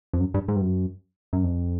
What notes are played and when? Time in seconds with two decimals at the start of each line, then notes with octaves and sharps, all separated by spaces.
0.13 F2
0.20 F#2
0.34 G2
0.48 G#2
0.56 G2
0.62 F#2
1.33 F#2
1.43 F2